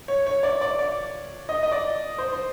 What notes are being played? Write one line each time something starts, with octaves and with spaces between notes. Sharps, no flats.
C#5
C#5
D5
D5
D5
D#5
D#5
D5
C5
C5